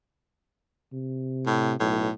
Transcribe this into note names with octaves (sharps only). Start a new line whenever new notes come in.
C3
A2
B1 A2